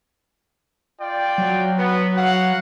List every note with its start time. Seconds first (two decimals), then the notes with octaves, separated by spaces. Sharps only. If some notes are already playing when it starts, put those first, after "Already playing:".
1.01 F4 D5 G5
1.38 F#3
1.79 B3
2.16 F#4 F5 F#5